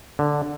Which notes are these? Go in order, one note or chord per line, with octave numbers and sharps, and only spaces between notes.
D3